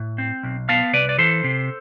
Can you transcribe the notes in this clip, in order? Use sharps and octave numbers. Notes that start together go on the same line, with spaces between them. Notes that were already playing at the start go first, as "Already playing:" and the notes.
Already playing: A2
C4
B1
B3 F5 A5
C2 B4 D5
D5
E3 A4 C5
C3